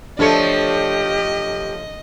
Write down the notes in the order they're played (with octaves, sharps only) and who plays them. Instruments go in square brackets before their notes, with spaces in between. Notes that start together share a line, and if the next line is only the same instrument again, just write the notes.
[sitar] F3 A3 C#5 [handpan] D4 A4 [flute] G4 [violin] D#5